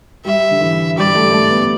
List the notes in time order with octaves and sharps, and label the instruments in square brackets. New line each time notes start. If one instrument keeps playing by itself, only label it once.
[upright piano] G3 [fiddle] E5
[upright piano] D3
E3
[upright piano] G3 [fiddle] D5
[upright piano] A3
A3
B3